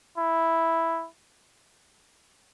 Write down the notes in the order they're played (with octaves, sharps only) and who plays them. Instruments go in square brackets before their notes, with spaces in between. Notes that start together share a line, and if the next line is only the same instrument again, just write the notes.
[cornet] E4